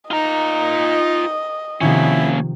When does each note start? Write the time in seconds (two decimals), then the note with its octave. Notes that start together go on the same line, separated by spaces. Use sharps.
0.11 D#4 F4 D#5 A#5
1.81 C3 D#3 F3 A#3 C#4 E4